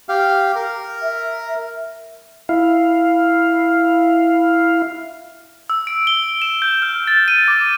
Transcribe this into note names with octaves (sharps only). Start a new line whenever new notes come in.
G4 F5
A#4
E5
E4 F5
E6
D7
G7
E7
G6
F6
A6
D#7
D6